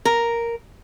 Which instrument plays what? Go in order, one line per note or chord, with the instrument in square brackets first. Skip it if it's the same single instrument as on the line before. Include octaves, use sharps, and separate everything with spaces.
[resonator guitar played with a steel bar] A#4